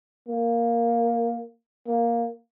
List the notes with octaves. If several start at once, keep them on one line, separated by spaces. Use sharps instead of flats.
A#3
A#3